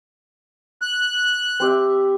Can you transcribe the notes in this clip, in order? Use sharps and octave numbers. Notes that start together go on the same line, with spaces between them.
F#6
C4 G4 E5